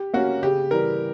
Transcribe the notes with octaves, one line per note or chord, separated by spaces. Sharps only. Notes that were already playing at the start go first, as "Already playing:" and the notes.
Already playing: G4
A#3 C#4 F#4
C#3 G4
E3 G3 A#4